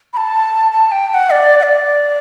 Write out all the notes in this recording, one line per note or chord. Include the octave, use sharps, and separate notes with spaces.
B5
A5
A5
G5
G5
F#5
D5
F#5
D5